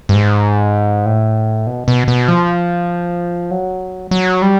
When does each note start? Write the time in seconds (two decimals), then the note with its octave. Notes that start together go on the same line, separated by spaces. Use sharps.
0.09 G2
0.14 G#2
1.06 A2
1.67 B2
1.88 B2
2.08 B2
2.28 F3
3.51 F#3
4.11 F#3
4.42 G3